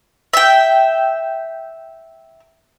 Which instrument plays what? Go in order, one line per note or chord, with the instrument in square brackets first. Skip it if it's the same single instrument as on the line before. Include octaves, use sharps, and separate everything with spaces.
[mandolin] E5 G5